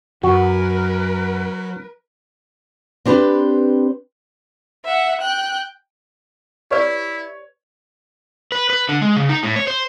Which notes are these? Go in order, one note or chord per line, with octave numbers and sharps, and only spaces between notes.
F#2 F#3 F#4 A#4 B4
C4 D4 G4 B4 C5
E5 F#5
G5 F#6
E4 G4 B4 C#5 D5
B4
B4
D3
G#3
C#3
D#4
A2
C#5
C5